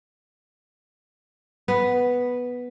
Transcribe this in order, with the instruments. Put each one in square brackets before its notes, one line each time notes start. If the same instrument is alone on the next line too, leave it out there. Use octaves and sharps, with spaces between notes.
[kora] B3